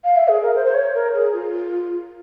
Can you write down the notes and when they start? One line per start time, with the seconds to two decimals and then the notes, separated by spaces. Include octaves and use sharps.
0.04 F5
0.16 E5
0.28 G#4
0.42 A#4
0.56 C5
0.66 C5
0.74 C#5
0.94 A#4
1.14 G#4
1.33 F4